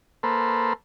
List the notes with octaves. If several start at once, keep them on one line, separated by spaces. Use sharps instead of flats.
A#3 A4 B4 C5